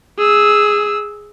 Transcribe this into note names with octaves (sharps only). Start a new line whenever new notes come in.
G#4 E6